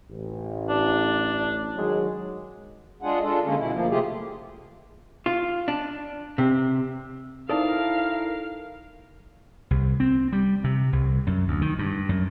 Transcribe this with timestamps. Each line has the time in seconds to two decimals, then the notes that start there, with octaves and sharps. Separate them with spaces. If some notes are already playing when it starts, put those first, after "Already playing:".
0.10 A1
0.69 D4
1.77 D#3 F#3 G#3
3.02 G#3 D4 F4 G#4 F#5
3.23 G#3 D4 F4 A4
3.44 D3 G#3 A#3 C#4
3.57 B2 E4
3.73 D2 F3 A#3
3.89 C3 A3 F4 G4 G#4
5.26 F4
5.68 D4
6.38 C3
7.49 D#4 E4 A4 A#4 C5 D5 F5 A5
9.71 C2
10.00 C4
10.32 G3
10.64 C3
10.93 C2
11.27 F#2
11.48 D2
11.62 D#3
11.79 G2
12.09 F#2